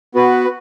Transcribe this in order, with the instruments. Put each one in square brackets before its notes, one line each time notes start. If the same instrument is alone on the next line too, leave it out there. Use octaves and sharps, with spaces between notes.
[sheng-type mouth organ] B3 F#4 B4